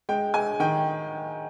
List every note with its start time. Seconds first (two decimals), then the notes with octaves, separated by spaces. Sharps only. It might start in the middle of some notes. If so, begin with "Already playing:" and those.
0.09 G#3 G5
0.34 G#3 G#5
0.60 D#3 G5